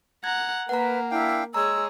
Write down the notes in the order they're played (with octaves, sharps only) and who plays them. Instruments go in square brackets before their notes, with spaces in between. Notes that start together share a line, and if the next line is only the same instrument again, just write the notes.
[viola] F#5 A#5 [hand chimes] G#6
[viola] A#3 A#4 [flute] B4 [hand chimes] F#5 A#5
[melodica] D4 F5 G5 [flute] E4
[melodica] G#3 [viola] G#4 C#5 [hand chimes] A#5 [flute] E6